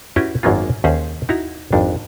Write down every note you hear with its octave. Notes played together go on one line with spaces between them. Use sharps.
C#4 E4 F#4 G4 B4 G5
G#1 F#2 F#3 A#3 B3 F4
D#2 C#4 G#4 C5
D#4 E4 F#4 A#5
G#1 F2 D4